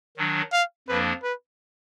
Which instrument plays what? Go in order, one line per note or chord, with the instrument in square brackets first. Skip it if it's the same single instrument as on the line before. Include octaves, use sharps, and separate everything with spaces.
[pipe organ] D#3 F#3 D4
[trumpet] F5
[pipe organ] F2 F3 A#3 D4 [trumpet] B4
[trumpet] B4